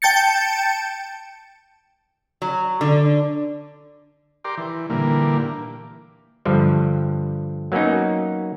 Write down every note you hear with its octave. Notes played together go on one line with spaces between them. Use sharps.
G5 A5 G6 A6 C#7
F#3
D3
G4 A#4 D5 C6
E3
A#2 D3 E3 G3 A#3
G2 D3 F3 G3
F#3 A#3 B3 C#4 D#4